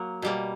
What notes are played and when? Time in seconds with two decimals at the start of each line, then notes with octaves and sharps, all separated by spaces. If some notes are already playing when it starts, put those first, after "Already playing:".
Already playing: F#3 A#3
0.22 B2 G3 A#3